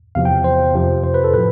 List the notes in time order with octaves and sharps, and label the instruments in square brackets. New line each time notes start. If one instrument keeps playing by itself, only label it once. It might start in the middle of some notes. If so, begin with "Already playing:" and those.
[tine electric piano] E2 C3 F3 F5
G5
C5
F2 C3 F3
C5
B4
A4
A2 B4